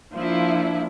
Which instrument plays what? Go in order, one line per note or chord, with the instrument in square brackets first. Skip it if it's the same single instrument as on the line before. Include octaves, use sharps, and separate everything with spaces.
[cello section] F3 E4 [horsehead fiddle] A#3 D4